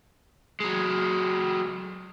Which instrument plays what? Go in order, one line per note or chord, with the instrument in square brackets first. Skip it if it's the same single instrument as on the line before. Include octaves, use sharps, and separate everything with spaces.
[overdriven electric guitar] F#3 G#3